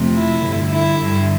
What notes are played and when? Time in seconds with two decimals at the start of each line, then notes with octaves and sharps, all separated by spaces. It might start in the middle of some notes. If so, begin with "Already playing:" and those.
Already playing: F2 C3 F3 A3
0.14 E4
0.43 G2 D3 G3
0.72 E4
1.00 G2 D3 G3